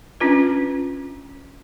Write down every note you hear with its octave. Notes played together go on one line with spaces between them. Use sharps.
C#4 D4 F4 B4